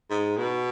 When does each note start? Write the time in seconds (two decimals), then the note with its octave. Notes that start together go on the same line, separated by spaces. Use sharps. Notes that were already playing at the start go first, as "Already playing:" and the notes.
0.11 G#2
0.37 B2